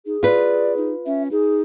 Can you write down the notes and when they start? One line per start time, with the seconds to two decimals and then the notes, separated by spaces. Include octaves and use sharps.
0.06 D#4 G#4
0.23 F4 B4 D5
0.77 D#4
1.06 C#4 E5
1.31 D#4 G#4